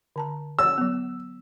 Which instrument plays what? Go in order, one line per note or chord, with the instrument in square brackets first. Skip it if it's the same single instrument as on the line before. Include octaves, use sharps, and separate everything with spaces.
[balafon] D3 A5 A#5
[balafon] C#5 [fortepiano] E6
[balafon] F#3 B3